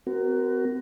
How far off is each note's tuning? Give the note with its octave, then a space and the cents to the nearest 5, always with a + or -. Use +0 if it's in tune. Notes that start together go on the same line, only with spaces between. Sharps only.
C4 -45 F#4 +20 A#4 +0